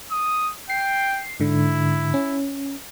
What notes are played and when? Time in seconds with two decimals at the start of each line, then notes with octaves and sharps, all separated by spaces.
0.12 D#6
0.70 G5 C7
1.40 G#2 D3 E4
2.14 C#4